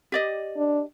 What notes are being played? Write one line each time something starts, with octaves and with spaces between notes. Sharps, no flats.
G4 D5 D#5
D4